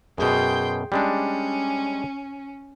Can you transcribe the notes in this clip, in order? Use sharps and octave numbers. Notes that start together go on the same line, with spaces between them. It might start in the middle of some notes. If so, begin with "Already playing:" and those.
F#2 B2 G#4 G5 C6
G3 G#3 C#4 D4